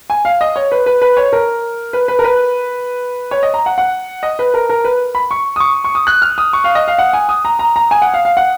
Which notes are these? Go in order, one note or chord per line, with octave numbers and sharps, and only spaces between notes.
G#5
F5
D#5
C#5
B4
B4
B4
C#5
A#4
B4
B4
A#4
B4
C#5
D#5
A#5
F#5
F#5
D#5
B4
A#4
A#4
B4
B5
C#6
D#6
C#6
C#6
D#6
F#6
F6
D#6
C#6
F5
D#5
F5
F#5
G#5
D#6
A#5
A#5
A#5
G#5
F#5
F5
F5
F#5